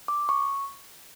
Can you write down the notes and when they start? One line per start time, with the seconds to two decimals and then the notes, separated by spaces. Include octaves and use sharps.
0.08 D6
0.29 C#6